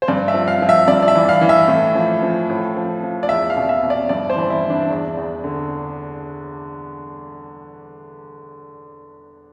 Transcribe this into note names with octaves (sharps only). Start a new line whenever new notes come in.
C5
G2 D5
E5
F3
F5
F3
E5
G2 D5
D5
E5
E3
F5
E3
E5
A2
F3
F3
A2
F3
F3
D5
E2 E5
F5
B2
E5
B2
D5
G2 D5
C5
E3
E4
E3
D4
E2
E2
D3